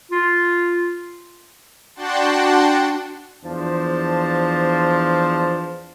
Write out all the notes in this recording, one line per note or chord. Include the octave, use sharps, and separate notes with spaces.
F4
D4 F#4 F#5 G5 A5 C6
E2 F3 D4 C5 A5